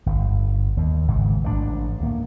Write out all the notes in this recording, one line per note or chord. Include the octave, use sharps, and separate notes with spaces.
G1
D#2
G#1 G#2 C#3 E3
A1 G#2 C3 D4
D2 A#3